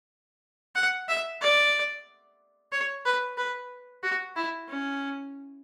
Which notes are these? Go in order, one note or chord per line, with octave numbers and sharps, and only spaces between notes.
F#5
E5
D5
C#5
B4
B4
F#4
E4
C#4